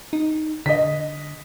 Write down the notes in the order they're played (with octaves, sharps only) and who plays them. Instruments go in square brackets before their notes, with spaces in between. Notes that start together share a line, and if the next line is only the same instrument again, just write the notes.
[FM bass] D#4
[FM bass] D3 [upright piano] D#5 B6